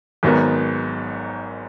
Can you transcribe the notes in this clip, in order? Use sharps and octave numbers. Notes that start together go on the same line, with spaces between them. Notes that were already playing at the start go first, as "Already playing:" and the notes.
G#1 G#2 D#3 F#3 B3